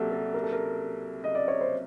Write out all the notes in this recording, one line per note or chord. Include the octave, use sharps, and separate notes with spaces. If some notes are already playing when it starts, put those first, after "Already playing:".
Already playing: C2 F#3 A#3 F#4 G4 A4
A4
A#4
A4
A#4
D#5
D5
C#5
C5